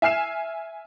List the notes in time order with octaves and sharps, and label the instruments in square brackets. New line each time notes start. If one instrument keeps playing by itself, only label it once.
[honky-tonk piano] E5 G#5 F6 C7 E7